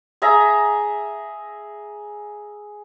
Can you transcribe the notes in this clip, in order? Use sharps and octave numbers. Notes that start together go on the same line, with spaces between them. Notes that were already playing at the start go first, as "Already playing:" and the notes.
G#4 E5 A#5